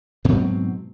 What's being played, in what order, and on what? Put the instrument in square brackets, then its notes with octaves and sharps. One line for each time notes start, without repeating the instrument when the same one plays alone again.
[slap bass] G#2 B2 F#3 C4